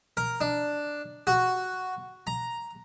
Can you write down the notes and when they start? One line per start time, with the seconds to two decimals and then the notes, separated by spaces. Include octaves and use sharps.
0.17 A#4
0.41 D4
1.27 F#4
2.27 A#5